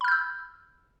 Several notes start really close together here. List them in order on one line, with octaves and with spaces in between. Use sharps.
B5 F6 G6 E6